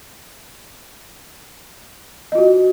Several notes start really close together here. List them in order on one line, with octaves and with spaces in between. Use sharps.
D#5 F4 F#4